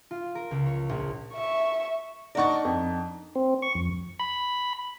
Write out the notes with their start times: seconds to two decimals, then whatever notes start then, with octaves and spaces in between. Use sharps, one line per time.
0.11 F4
0.35 A#4
0.51 C#2
0.66 C#5
0.89 A#1
1.33 E5 C#6
2.35 D4 D#4 A#4 D5 F#5 C#6
2.65 F2
3.35 C4
3.62 C#6
3.75 F2
4.19 B5